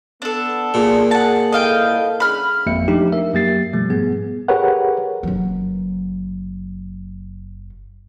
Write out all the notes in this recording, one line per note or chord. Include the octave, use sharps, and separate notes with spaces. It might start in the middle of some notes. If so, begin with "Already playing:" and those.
B3 D4 A4
A#2 G#4
F#5 A5
C2 E4 A4 D#5 F5 G5
D3 C#4 G#4 B5 F6
G#1 F2 G#3 A#3 E5 C#7
F3 A3 D4 D#4 G4
A#4 E5
F#2 F#3 A#3 G4 A6 C7
B2 F3 G3 A3
G#2 B3 G#4
G4 G#4 A#4 B4 C#5 F#5
F#1 F#3